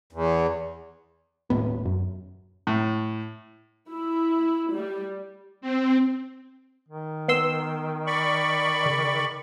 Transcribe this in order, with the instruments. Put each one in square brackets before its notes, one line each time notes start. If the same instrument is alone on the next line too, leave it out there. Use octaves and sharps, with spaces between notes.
[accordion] E2
[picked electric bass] D#1 A2 B3
F#2
[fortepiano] A2
[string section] E4
G3
[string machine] C4
[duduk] D#3
[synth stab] B3 C6 E6
[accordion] D5 B5 C#6
[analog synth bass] C#3